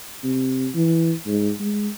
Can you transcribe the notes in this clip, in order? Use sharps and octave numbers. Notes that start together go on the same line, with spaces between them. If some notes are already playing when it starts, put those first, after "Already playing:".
C3
E3
G#2
G#3